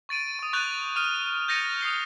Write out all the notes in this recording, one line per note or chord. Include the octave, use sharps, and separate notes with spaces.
C#6 A6 D7 D#7
C#6 D#6
C#6 F#6 G6 A6 F7 F#7
D#6 F6 D#7
G6 A6 A#6 C#7 D#7 F7
D#6 F6 C7 G7